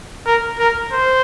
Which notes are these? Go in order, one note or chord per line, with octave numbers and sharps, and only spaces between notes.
A#4
A#4
C5